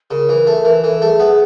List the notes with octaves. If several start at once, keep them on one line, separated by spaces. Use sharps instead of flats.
C#3 A#4
E3
A3
E3
E3 A4
A3 G#4
B3